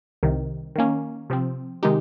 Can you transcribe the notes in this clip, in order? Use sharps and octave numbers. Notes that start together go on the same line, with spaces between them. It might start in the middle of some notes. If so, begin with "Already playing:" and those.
C2 C3 D#3
D#3 A#3 C#4
C3 F3 C4
C3 D#3 G#3 D#4 G4